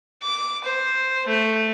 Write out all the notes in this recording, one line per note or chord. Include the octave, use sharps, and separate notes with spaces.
D6
C5
A3